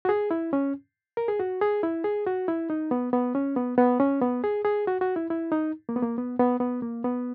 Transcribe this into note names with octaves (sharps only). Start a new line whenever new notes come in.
F#4
G#4
E4
C#4
A#4
G#4
F#4
G#4
E4
G#4
F#4
E4
D#4
B3
B3
C#4
B3
B3
C#4
B3
G#4
G#4
F#4
F#4
E4
E4
D#4
A#3
B3
A#3
B3
B3
B3
A#3
B3